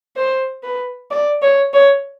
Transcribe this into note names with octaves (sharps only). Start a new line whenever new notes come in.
C5
B4
D5
C#5
C#5